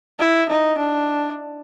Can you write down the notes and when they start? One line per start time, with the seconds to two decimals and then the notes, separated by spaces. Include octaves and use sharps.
0.19 E4
0.49 D#4
0.78 D4